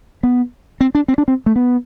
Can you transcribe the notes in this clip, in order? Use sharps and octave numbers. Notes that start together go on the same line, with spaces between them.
B3
C4
D4
C4
D4
C4
A3
B3